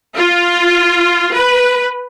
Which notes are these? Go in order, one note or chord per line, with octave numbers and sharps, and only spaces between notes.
F4
B4